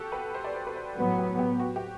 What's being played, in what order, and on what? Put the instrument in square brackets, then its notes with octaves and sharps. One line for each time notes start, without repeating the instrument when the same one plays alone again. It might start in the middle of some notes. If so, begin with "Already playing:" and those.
Already playing: [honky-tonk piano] F#4 G4 A4
B4
C5
D5
C5
B4
C5
[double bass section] A2 F#3 B3
[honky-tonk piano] G4
G4
F#4
G4